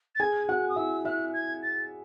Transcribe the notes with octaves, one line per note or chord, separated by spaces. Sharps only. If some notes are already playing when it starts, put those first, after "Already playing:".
A6
G#4 G#5 G#6
F#4 F#5 F#6
D#6
E4 E5 E6
E4 E5 F#6
G#6
A6